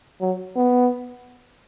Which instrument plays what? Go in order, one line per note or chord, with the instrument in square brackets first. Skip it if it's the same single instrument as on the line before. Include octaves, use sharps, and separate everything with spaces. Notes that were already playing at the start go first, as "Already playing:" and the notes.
[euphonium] F#3
B3